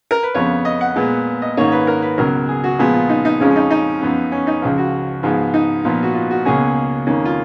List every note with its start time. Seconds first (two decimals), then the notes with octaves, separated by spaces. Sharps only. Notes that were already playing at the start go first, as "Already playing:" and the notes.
0.11 A#4
0.23 B4
0.34 F2 C#3 F3 B3 C#5
0.65 D#5
0.81 F#5
0.95 A#2 G#3 B3
1.42 D#5
1.57 G#2 D#3 A#3 C#4 C#5
1.72 B4
1.87 A#4
2.02 B4
2.18 C#2 B2 F#3 A#4
2.49 G#4
2.64 F#4
2.79 A#2 F3 G#3 B3 G#4
2.94 F4
3.09 D#4
3.25 D#4
3.40 F2 C#3 F3 G#3 C#4
3.50 C#4
3.56 D#4
3.71 D#4
4.02 F#2 F3 B3
4.32 C#4
4.47 D#4
4.62 C#2 C#3 F3
4.78 F#4
5.23 G#2 F3 G#3 B3
5.54 D#4
5.84 A#2 F3 B3
6.03 F#4
6.15 F4
6.31 F#4
6.45 C#2 B2 A#3 C#4 G#4
7.06 F2 D#3 A#3 C#4
7.25 F4